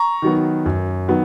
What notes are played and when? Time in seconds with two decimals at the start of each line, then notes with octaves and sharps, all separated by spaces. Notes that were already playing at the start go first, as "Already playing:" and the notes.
Already playing: A#5 C#6
0.22 D#3 F#3 B3
0.66 F#2
1.08 D#3 F#3 B3